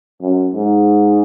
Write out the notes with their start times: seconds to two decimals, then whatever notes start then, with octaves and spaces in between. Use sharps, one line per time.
0.21 F#2
0.54 G#2